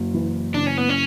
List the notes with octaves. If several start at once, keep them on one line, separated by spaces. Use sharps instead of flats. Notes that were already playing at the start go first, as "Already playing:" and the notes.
Already playing: F#1
E3
C#3 D4
C#4
B3
C#4